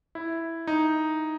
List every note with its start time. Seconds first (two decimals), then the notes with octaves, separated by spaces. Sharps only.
0.15 E4
0.67 D#4